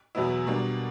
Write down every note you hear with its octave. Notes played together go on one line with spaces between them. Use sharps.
E2 B2 F#3 B3 E4
B2 G3 A#3 D4